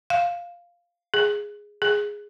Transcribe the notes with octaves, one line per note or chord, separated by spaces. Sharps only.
F5
G#4
G#4